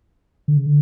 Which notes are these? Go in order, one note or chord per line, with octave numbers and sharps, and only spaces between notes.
D3
C#3
D3